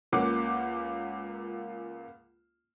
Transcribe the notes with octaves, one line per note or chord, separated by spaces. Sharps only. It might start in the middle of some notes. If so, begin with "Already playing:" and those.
C#2 A#3 C#4 F4 F#5 D6